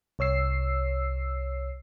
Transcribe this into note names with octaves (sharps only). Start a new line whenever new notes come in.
C2 C#5 E6 C7